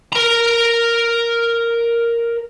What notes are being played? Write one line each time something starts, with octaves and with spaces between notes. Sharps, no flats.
A#4 A#5